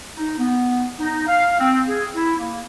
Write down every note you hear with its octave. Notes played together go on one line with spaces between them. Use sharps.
D#4
B3
D#4
F5
C4
G#4
E4
A#3